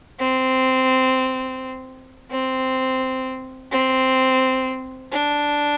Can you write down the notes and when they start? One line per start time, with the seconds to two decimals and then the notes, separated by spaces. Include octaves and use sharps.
0.20 C4
2.31 C4
3.71 C4
5.12 D4